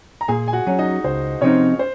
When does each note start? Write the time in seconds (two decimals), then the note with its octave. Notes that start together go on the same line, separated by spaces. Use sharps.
0.21 A#5
0.28 A#2 G#4 G#5
0.48 G#5
0.53 F#4 F#5
0.67 F#3 C#4
0.78 D#4 D#5
1.04 C#2 C5
1.41 C3 F3 C4 C#4 D#4 C#5
1.79 C5